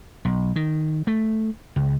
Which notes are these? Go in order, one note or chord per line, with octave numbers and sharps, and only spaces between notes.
B1
D#3
A3
C#2